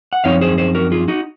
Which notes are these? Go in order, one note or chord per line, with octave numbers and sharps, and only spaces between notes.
F#5
F#2 F3 C4 D#4 C#5 F5
G#4 C5
G#4 C5
F#4 A#4
F4 G#4
D#4 F#4